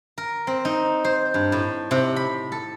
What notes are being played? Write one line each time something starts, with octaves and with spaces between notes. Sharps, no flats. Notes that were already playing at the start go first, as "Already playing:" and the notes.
A#4
C4
D#4
C5
G2
A2
C3
B5
A4